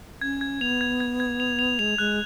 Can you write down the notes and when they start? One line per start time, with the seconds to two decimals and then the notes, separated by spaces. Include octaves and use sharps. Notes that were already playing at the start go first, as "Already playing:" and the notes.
0.21 C#4 G#6
0.41 G#6
0.61 B3 F7
0.81 G#6
1.00 G#6
1.20 G#6
1.40 F7
1.59 F7
1.79 G#3 F7
1.98 G#3 F#6